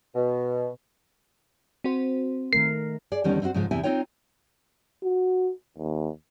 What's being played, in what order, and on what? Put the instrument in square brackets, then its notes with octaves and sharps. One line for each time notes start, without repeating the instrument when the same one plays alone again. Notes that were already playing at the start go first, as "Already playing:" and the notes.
[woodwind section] B2
[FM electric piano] C4 F#4 C5
[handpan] D#3 A3 A#4 [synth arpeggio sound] C7
[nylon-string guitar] G#4 D5
E2 D3 D#3 G3 B3 C#4
C4 D#4 E4 F#4 C5
G#2 C#3 F3 G#3
E2 C3 E4 E5 G5 G#5
C4 C#4 D#4 F4 C#5 G5
[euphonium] F#4
D#2